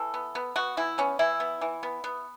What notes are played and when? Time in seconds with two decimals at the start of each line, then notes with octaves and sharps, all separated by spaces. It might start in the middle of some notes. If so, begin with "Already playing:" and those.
Already playing: E3 A4
0.14 B3
0.35 B3
0.56 B3 F#4
0.77 E3 E4
0.98 B3 C#4
1.19 E3 E4
1.40 B3
1.61 E3
1.83 B3
2.04 B3